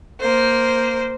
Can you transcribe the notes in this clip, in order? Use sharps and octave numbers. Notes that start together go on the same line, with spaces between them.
A#3 C5